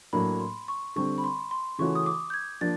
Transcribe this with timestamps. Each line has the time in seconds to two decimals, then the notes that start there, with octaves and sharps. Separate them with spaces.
0.13 A2 F#3 A#3 D4 B5
0.40 C6
0.68 C#6
0.96 D3 G3 C4 C#6
1.18 B5
1.24 C6
1.51 C6
1.79 C#3 E3 A3 C#4 F#4 C#6
1.95 D#6
2.06 D6
2.30 G6
2.34 G#6
2.61 F3 A#3 D4 A6